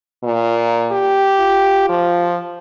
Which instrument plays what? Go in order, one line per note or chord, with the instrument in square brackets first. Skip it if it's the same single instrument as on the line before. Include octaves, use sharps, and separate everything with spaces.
[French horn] A#2
[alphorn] G4
[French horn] F4
[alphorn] F3